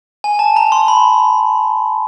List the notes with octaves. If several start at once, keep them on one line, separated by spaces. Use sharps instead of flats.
G#5
A5
A#5
C6
B5